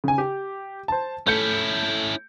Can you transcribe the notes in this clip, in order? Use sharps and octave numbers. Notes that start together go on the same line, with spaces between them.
C#3 G#5
G4
C5 A5
A3 C#4 E4 G6 C#7